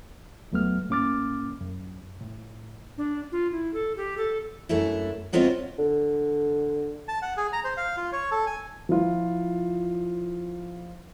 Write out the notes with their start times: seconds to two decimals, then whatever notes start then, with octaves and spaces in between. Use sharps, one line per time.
0.52 D#2 F#3 A3 B3 F6
0.89 A2 A#3 C#4 D6 F6 A6
1.61 F#2
2.21 A2
2.98 D4
3.32 F4
3.52 E4
3.74 A4
3.97 G4
4.17 A4
4.69 F#2 A3 D4 E4
5.32 D2 B3 C4 F4 C#5 D#5
5.78 D3
7.08 A5
7.22 F#5
7.37 G#4
7.53 A#5
7.64 C5
7.77 F5
7.97 F4
8.12 C#5
8.31 A4
8.47 G#5
8.89 F3 E4 F4